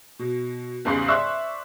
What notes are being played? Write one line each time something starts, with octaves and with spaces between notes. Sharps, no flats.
B2
E2 G#2 C#3 G3 C6 C7
C5 D5 E5 C#6 E6 F#6